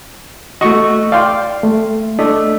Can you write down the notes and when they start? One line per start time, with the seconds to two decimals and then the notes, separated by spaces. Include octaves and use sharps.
0.61 A3 F#4 D#5 C#6
1.12 D5 F5 G5 C6
1.63 A3
2.19 A3 D4 D#5